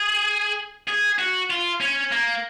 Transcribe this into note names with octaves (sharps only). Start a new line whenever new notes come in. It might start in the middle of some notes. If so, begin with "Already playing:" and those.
Already playing: G#4
G#4
F#4
F4
C#4
A#3